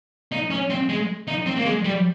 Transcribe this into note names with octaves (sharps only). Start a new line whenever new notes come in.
D#4
C#4
C4
G#3
D#4
C4
A#3
G#3
G3